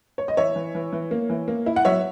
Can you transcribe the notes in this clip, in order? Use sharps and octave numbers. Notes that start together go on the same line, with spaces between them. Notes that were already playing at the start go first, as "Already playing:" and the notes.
C#5
D#5
E3 C#5 E5
E3
E3
E3
A#3
E3
A#3
E4
F#5
F#3 C#5 E5